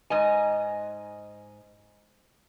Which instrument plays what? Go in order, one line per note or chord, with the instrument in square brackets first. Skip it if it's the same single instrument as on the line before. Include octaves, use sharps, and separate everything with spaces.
[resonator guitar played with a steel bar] G#2 D#5 G#5